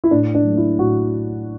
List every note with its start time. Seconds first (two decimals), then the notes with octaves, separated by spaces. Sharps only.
0.04 E4
0.11 A2 D4
0.35 D4
0.45 F#3 A3
0.57 E4
0.79 A2 F#4